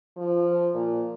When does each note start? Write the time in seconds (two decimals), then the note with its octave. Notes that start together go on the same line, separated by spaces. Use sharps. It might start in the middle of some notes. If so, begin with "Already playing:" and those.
0.17 F3
0.74 A#2